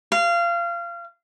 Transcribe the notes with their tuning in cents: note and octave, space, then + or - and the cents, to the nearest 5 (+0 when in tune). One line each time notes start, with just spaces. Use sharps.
F5 -25